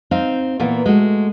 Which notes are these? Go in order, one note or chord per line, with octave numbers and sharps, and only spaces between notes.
C4 D#4 F5
A#2 E3 A#3 B3
G#3 A3 F#4